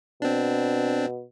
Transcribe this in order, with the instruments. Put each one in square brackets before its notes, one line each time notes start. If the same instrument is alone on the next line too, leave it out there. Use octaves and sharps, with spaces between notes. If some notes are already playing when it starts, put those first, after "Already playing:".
[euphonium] B2 [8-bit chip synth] C4 D4